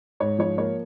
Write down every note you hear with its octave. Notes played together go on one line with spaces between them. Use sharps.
G#2 C#5
F3 C#5
A#3 C#5